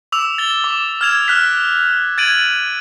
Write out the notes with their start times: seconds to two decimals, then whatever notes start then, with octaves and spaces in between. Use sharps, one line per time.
0.12 D6 E6 F7
0.38 A6 G7
0.64 D6
1.01 F6 G#6 F7
1.28 F6 F#6 B6
2.18 G#6 A6 D7 D#7 F#7